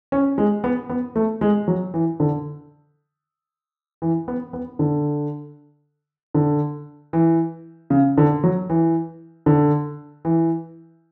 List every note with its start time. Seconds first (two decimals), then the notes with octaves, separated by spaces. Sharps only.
0.12 C#4
0.38 G#3
0.64 B3
0.89 B3
1.16 A3
1.41 G#3
1.68 F#3
1.94 E3
2.20 D3
4.02 E3
4.28 B3
4.53 B3
4.79 D3
6.34 D3
7.13 E3
7.90 C#3
8.18 D3
8.44 F#3
8.70 E3
9.46 D3
10.25 E3